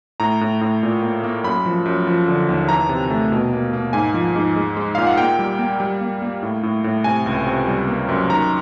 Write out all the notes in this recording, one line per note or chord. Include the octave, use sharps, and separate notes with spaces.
A2 A#5
A2
A2
A#2
A#3
A#3
F#2 B5
F3
F#2
F3
D3
D#2
E3 A#5
C3
A3
B2
A#3
A#3
G#2 G#5
F3
G#2
G#3
G#3
A#2 F5
F#5
A#3 G5
G3
A#3
G3
A#3
A#3
A2
A2
A2
C3 G#5
C#2
C3
G3
A#3
F#2
D#3 A#5